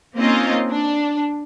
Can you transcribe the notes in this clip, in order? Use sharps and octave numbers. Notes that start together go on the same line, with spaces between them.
A#3 C4 C#4 D#4 F4 D#5
D4